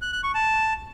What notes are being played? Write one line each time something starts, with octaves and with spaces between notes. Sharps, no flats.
F#6
F#6
C#6
A5